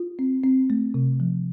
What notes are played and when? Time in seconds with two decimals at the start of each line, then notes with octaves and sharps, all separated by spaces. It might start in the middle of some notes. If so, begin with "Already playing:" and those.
Already playing: F4
0.19 C4
0.43 C4
0.70 A3
0.94 C3
1.20 F3